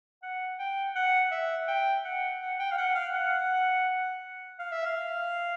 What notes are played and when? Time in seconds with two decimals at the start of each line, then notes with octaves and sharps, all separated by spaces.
0.23 F#5
0.59 G5
0.95 F#5
1.31 E5
1.68 G5
2.05 F#5
2.41 F#5
2.59 G5
2.71 F5
2.78 F#5
2.95 F5
3.14 F#5
4.59 F5
4.72 E5
4.85 F5